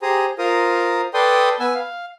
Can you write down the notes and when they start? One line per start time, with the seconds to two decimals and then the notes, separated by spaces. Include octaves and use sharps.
0.02 G4 G#4 C5 A#5 D#6
0.38 F4 A#4 C5 A#5 D#6
1.14 A4 B4 D5 G5 C6 D#6
1.60 B3 B4 G#5 E6
1.75 F5